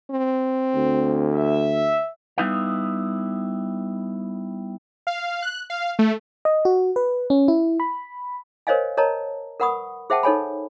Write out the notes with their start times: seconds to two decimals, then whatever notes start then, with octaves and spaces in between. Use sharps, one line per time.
0.11 C4
0.75 D2
1.34 E5
2.38 G3 B3 D#4 E4 B4 F5
5.07 F5
5.42 F#6
5.70 F5
5.99 A3
6.45 D#5
6.65 F#4
6.96 B4
7.30 C#4
7.48 E4
7.80 B5
8.67 A#4 C5 C#5 D#5 F5 G#5
8.97 A#4 C#5 D#5 A5 A#5
9.60 A#4 B4 F#5 B5 C#6 D#6
10.10 G#4 C5 E5 F#5 G5 A5
10.23 D#4 A4 C#5 G#5 B5